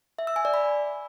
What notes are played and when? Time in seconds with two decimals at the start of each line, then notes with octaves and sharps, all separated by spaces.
0.19 E5
0.27 E6
0.36 G#5
0.45 D5
0.54 B5